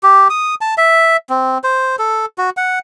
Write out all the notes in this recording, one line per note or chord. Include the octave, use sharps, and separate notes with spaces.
G4
D#6
A5
E5
C4
C5
A4
F#4
F#5